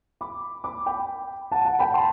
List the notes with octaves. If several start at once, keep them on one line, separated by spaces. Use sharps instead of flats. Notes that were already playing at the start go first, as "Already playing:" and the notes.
B5 D6
B5 D6
G5 B5
F#5 A5
F#5 A5
G5 B5
A5 C6